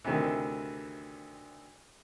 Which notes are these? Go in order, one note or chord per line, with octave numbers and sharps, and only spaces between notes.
D2 C3 D#3 E3